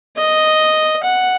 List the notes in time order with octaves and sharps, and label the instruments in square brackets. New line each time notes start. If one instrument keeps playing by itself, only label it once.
[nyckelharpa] D#5
F#5